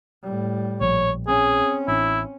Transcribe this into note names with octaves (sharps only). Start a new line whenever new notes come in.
A2 G3
A#1 F3 C#5
C4 C#4 G#4
A1 D4 E4